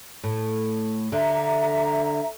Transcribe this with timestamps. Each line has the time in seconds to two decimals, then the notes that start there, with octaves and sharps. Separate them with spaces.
0.24 A2
1.12 D3 E5 A#5